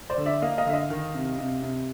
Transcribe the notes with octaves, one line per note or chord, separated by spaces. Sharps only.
C5 D5
D3
D5 E5
A#3 D#5 F5
D#5 F5
D3 E5
D#5 F5
D#3
C3
C3
C3